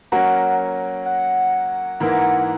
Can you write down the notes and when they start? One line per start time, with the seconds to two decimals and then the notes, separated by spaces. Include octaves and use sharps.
0.12 F#3 A#3 C#4 F#4 A#4 F#5
1.06 F#5
2.00 G#2 E3 A#3 E4 A#4